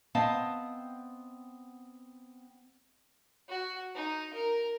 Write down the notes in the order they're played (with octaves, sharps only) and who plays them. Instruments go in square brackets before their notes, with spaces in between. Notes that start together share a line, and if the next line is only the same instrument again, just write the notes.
[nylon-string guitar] B3 C4 D#5 F5 A5
[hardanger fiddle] F#4
D#4
A#4